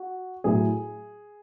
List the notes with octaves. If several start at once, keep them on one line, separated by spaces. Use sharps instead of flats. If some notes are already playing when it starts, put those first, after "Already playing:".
Already playing: F#4
A2 F#3 G#4